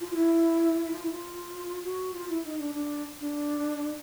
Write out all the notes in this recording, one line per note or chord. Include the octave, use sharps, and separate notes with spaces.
F4
F4
E4
E4
F4
E4
F4
F#4
F4
E4
D#4
D4
D4
D4